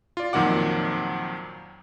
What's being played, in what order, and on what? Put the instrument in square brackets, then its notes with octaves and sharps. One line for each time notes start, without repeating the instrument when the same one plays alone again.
[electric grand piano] F4 D5
F2 A#2 D#3 F#3 F#5 D6